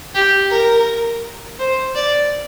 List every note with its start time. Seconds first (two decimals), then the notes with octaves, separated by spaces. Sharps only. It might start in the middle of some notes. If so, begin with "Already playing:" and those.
0.15 G4
0.50 A#4
1.59 C5
1.95 D5